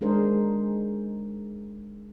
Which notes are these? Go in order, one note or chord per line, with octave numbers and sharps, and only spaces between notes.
G#3 D4 D#4 G#4 A#4 C5